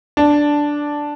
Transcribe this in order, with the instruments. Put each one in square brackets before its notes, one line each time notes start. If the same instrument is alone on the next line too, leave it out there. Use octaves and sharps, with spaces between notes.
[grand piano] D4